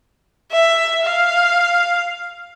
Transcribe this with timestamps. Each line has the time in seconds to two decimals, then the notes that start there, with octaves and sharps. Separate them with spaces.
0.52 E5
1.04 F5